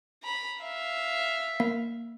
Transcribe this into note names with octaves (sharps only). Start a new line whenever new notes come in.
A#5 B5
E5 F5
A#3